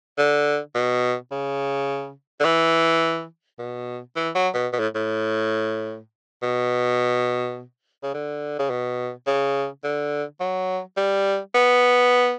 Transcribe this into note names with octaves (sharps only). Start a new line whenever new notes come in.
D3
B2
C#3
D3
E3
B2
E3
F#3
B2
B2
A2
A2
B2
C#3
D3
C#3
B2
C#3
D3
F#3
G3
B3